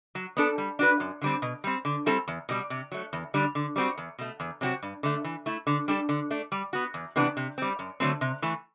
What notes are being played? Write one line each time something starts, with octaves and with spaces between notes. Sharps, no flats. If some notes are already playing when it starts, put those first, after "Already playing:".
F#3
B3 D4 A4
G3
D4 F#4 B4
F#2
D3 G3 C4
B2
G3 C4
D3
G3 C4 E4 A4
E2
B2 G3
C3
F#3 A3
E2
D3 G3 D4
D3
G3 C4 F#4
E2
B2 A3
E2
C3 F#3 C4 F#4
G2
D3 A3
E3
A3 E4
D3
G3 D4 A4
D3
A3 D4
G3
B3 F#4
E2
C3 E3 B3 D4
C3
G3 C4
F#2
D3 F#3 A3 C4
C3
E3 A3